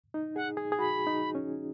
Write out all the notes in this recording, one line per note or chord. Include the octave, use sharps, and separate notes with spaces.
D#4
G#4 F#5
G#4
G#4
F#4 B5
D#4
C#4